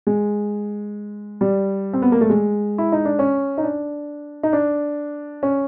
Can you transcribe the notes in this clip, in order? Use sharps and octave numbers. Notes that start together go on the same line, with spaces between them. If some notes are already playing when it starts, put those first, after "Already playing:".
G#3
G3
C4
B3
A#3
A3
G#3
E4
D#4
D4
C#4
D#4
D4
D#4
D4
C#4